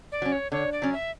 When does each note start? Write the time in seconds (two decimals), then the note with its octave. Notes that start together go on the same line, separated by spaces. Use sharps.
0.12 D5
0.22 F#3 C#4
0.32 C#5
0.52 D3 C#5
0.72 D5
0.82 F#3 C#4
0.93 E5